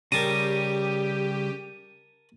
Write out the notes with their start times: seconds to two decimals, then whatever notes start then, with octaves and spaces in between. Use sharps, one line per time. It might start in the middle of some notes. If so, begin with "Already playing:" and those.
0.12 C#3 G3 G4 A#4 A5 A#5 D#7